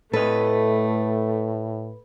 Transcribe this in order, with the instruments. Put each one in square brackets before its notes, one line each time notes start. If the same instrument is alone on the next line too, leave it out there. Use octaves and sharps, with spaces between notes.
[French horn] A2 [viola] A3 [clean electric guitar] A4 D#5 [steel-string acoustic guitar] B4